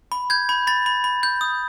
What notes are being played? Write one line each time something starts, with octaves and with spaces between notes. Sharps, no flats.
B5
G6 G#6
B5
B5 A6
B5
B5
G6
D#6